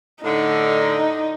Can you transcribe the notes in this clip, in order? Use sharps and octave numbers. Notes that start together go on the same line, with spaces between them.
A2 D3 D#4